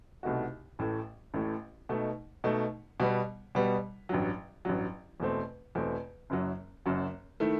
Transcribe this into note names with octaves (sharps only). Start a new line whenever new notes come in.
C2 B2 A3 D#4 F#4
A1 A2 E3 A3
A1 A2 E3 A3
B2 A3 D#4
B2 A3 D#4
B2 G3 B3
B2 G3 B3
A1 G2 F#3
A1 G2 F#3
E2 B2 A3 C4
E2 B2 A3 C4
F#1 F#2 F#3
F#1 F#2 F#3
D#3 A3 E4